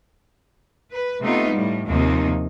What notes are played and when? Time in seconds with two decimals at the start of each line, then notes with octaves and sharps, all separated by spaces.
0.91 B4
1.23 C3 A3 B3 D#4 F4
1.53 A2 G3
1.88 D#2 C3 F3 A#3 D#4